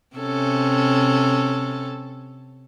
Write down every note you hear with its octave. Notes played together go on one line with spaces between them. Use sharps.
C3 C#4 A4